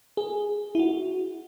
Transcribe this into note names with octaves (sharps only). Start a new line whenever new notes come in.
G#4
E4
F#4